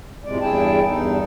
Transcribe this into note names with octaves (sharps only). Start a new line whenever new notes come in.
F2 A2 C3 G#3 D5
E2 G2 E4 G#4 G5 A5
E2 G2 D#4 A4